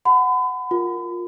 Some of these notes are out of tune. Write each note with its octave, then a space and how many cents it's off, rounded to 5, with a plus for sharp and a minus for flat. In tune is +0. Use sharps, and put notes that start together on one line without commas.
F#5 +0 B5 +40
F4 +15 A#4 +0